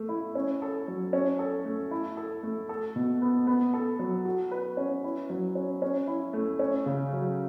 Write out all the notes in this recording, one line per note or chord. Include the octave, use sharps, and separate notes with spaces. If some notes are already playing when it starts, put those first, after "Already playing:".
Already playing: A3
E4
C#4
A4
F#3
C#4
A4
A3
E4
A4
A3
A4
B2
B3
B3
A4
F#3
F#4
B4
C#4
E4
F#3
C#4
C#4
E4
A3
C#4
C#3
F#3